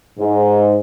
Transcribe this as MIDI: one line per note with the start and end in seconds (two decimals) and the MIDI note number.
0.19 0.80 44